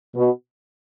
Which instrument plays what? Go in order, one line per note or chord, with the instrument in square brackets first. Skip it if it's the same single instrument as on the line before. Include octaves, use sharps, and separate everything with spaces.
[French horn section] B2